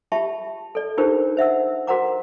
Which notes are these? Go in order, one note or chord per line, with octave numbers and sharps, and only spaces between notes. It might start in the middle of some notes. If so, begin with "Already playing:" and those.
F4 G4 E5 A5 B5 C#6
A4 D5
D4 D#4 F4 G4 A#4 C5
C5 E5 F#5 E6
F#4 A#4 C5 F#5 A#5 D6